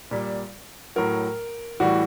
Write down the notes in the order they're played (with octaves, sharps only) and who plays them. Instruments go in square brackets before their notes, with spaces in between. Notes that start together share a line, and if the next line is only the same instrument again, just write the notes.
[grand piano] A#2 G3
A2 F#3 A#4
A2 E3 G3 F#4